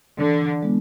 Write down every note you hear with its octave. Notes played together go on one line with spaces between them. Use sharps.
D3 E3
G#3 B3 E4